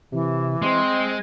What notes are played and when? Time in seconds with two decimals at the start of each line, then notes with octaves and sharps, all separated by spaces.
0.12 C3 E3
0.62 G#3 C4 C6